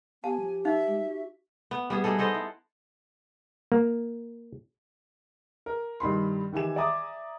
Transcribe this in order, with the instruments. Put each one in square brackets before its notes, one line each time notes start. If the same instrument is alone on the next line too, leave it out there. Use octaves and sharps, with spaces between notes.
[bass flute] B3 [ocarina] G4 [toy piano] F5 A5 [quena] G#5
[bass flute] F3
[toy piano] D#4 F5 [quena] E5
[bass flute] G#3
F#4
[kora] B3
G3 B3 G#4
G3 D#4 G#4 A4
B3 A4 C5 D#5
E4
[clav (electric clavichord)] A#3
[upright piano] A#4
G2 D#3 B5 C6
D#3 E3 G4 G#5 E7
D5 E5 G#5 A#5 D6 D#6